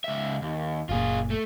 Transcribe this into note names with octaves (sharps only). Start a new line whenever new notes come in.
C#2 E5
D#2
F#1 A#2 F4 G#4
A3